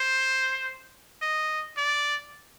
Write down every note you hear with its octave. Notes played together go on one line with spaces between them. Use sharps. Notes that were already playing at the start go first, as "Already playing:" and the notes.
Already playing: C5
D#5
D5